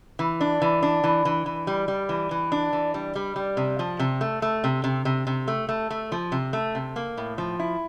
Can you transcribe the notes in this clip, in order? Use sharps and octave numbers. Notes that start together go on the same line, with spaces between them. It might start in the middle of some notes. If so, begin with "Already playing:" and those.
E3
D4
E3
D4
E3
E3
E3
G3
G3
E3
E3
D4
E3
G3
G3
G3
C3
F3
C3
A3
A3
C3
C3
C3
C3
A3
A3
A3
F3
C3
A3
C3
A#3
A2
F3
E4